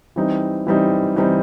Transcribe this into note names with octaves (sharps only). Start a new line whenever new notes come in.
E3 G3 C4 D#4
E3 G3 C4 D#4
E3 G3 C4 D#4